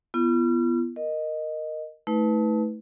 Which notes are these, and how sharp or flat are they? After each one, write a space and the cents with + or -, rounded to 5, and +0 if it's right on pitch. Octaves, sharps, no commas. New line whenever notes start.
B3 +0 F4 -45
A#4 +0 D#5 -5
A3 -10 D#4 +45 B4 +0